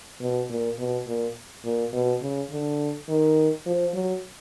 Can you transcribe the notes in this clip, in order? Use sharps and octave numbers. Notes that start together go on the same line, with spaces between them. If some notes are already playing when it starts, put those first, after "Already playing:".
B2
A#2
B2
A#2
A#2
B2
C#3
D3
D#3
F3
F#3